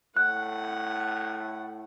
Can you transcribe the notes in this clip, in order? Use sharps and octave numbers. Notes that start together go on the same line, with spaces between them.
A2 F#5 F#6